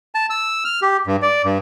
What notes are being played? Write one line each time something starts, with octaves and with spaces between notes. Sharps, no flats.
A5
E6
F6
G4
G2
D5
G2